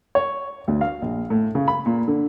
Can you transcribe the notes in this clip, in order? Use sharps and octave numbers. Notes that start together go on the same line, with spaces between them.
C#5
D2
F5
A#1
A2
C#3
B5
A#2
D3